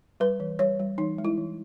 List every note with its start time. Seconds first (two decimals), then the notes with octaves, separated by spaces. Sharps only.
0.20 G3 B4
0.40 E3
0.59 G3 C#5
0.79 G3
0.98 E3 D#4
1.18 G#3
1.25 E4
1.37 E3